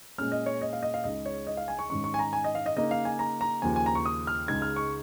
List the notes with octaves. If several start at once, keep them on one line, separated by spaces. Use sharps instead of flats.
A#2 G#3 C#4 F6
D#5
C#5
D#5
F5
D#5
F5
C#2 C#3 G#3 D#4 D#5
C#5
D#5
F5
G#5
C#6
G#2 D#3 C#4 C#6
C#6
G#5
A#5
G#5
D#5
F5
D#5
C#3 A#3 D#4 D#5
F5
G#5
A#5
A#5
D#2 C#3 F3 G#5
G#5
A#5
C#6
D#6
F6
C#2 C#3 G#3 D#4 G#6
F6
C#6